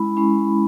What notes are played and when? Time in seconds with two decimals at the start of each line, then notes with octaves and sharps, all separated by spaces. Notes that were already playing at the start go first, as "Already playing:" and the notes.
Already playing: G#3 C#4 E4 B5
0.17 G#3 C#4 E4